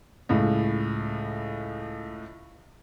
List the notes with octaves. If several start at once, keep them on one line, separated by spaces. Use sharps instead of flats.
C#2 A2